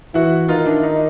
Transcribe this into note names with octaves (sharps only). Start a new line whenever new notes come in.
E3 E4 F#4
D#3 D#4 F4
D4 E4
D#4